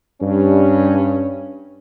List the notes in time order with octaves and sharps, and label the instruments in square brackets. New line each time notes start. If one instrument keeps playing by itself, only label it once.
[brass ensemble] G2 C#4